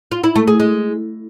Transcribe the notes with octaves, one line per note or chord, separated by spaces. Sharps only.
F4
E4
A3
G#4
G#3